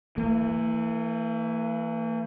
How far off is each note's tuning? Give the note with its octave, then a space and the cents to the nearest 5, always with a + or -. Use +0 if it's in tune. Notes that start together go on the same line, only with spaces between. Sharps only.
E3 +0 A#3 -45